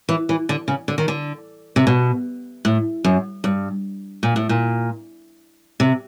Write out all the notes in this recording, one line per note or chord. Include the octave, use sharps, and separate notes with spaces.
E3
E3
D3
C#3
D3
D#3
D3
C3
B2
A2
F#2
G2
A#2
A2
A#2
C3